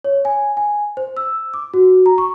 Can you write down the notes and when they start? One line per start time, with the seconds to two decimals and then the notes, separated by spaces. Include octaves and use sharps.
0.04 C#5
0.25 G#5
0.57 G#5
0.97 C5
1.17 E6
1.54 D6
1.74 F#4
2.06 A#5
2.18 C#6